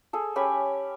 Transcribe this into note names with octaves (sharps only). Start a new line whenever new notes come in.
G#4 A4
C#4 G4 G#5 B5